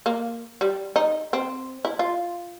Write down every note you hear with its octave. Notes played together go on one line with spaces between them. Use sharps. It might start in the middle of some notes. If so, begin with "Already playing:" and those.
A#3
G3
D#4
C4
E4
F4